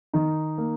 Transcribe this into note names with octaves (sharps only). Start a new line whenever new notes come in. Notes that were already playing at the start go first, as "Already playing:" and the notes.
D#3 D#4
A#3